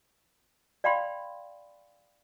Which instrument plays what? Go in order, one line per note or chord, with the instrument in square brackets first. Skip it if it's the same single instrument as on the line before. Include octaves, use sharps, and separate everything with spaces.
[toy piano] D5 F5 G5 B5 C6